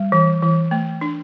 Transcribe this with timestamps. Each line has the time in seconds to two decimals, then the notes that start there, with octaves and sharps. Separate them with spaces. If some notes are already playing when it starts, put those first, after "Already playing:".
Already playing: G3
0.12 E3
0.42 E3
0.71 A3
1.01 D4